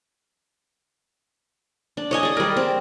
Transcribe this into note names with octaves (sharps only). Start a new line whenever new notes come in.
D4
C#5 D#5 G#5
G#4 D5
G3 A#4
C4